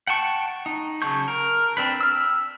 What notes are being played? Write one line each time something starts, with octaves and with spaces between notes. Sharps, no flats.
F#5 G5 A5 C#6
D#4
C#3 F#3 A5 C#6 G6
A#4
C4 D4 B4
E6 F6